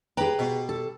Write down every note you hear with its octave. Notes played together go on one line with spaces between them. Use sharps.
G4 G#4 B4 A#5
B2
A4